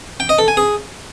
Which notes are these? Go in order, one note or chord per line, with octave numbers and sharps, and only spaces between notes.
G5
D#5
A4
G#5
G#4